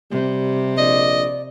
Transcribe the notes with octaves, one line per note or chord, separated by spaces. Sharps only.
C3 G3
A#1 D5 D#5